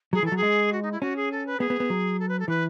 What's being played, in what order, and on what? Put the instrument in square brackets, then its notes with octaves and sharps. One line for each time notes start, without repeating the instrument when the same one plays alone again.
[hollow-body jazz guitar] F#3 [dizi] G#4
[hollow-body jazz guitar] E3 [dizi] A4
[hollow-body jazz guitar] F#3
[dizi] G#4
[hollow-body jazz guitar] G#3
[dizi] F#4
D#4
E4
[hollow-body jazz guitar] C#4 [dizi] F#4
[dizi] G#4
A4
B4
[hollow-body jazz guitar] B3 [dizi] G#4
[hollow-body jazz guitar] B3
B3
F#3
[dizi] A4
B4
A4
[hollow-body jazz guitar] E3 [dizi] B4